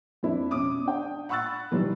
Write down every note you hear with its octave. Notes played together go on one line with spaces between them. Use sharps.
F2 D4 E4
B2 C#4 D6 D#6
D4 G5
F#5 B5 C#6 E6 F#6 A6
B2 D#3 E3 F#3 G3 F4